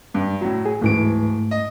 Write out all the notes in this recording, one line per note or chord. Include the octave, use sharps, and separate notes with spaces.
G2
A2 F#3
G#4
D1 G#2 E3 A3 D7
D#5